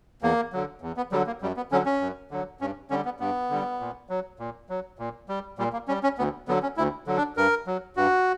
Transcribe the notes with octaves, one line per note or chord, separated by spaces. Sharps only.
E2 A#3
D3 F#3
E2
B3
D3 F#3 G3
A#3
F#2 G3
B3
D3 F#3 C#4
C#4
F#2
D3 F#3
G2 C#4
D3 G3 C#4
B3
G2 B3
D3 G3
A#2
F#3
A#2
F#3
A#2
G3
A#2 G3
A#3
G3 C#4
C#4
D2 B3
D3 F#3 B3
C#4
D2 E4
D3 F#3
D4
G2 A#4
F#3
G2 F#4